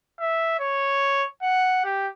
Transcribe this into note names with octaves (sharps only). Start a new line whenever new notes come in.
E5
C#5
F#5
G4